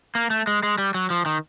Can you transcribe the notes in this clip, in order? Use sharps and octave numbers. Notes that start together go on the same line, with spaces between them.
A#3
A3
G#3
G#3
G3
F#3
F3
D#3